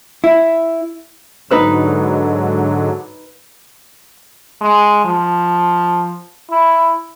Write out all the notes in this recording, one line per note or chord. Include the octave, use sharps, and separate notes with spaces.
E4
G#2 D3 F#3 D#4 B4 E6
G#3
F3
E4